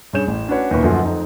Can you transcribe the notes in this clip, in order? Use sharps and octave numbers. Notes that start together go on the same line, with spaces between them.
G2 C#4 G#4 C#5 G6 E7
A1
C#4 D4 F#4 B4 C#5
D#2 A#2 D#4 E4 B4 C#6
F#2 D3 F3 F#3 A3 F4
F2 D#4